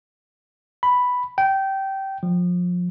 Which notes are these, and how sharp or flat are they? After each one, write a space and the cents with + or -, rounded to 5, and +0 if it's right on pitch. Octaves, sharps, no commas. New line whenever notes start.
B5 +0
G5 -20
F3 +30